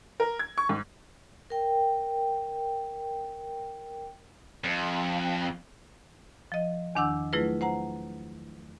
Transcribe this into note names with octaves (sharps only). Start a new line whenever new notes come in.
A#4
G#6
C#6
G#2
A#4 G5
F2
F3 D#5
E2 D#3 D4 F#5 D6 E6
F#3 A3 E4 F4 G#4 B4
C5 F#5 A#5